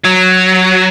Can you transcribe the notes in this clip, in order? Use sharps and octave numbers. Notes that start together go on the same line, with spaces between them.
F#3